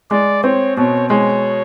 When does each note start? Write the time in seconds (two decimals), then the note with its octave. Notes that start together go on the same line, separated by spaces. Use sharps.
0.11 G#3 D5
0.44 C4 C#5
0.77 B2 C#5
1.10 G#3 C#5